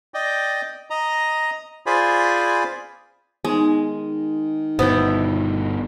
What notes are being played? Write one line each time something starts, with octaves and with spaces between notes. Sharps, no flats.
D5 D#5 G5
D#5 A#5
F4 G#4 C5 D5 G#5 B5
D#3 G#3 B3 D#4
G1 B2 B3 E4 C5 G5